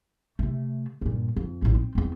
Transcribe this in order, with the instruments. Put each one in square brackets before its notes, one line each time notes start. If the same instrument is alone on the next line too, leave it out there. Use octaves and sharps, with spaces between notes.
[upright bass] C3 A3
G2 A#2
F2
A#1 A2
C4
E2 C4